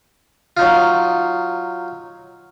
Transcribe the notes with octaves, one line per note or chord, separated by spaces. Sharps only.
F#3 D#4 F4